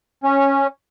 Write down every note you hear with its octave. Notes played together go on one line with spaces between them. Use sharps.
C#4